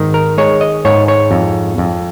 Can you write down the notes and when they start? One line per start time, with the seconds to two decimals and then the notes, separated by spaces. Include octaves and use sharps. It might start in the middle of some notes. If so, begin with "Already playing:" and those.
Already playing: G#2 D#3
0.14 A#4
0.38 G#3 C#5
0.61 D#5
0.85 G#2 C#5
1.08 C#5
1.31 F2
1.78 F2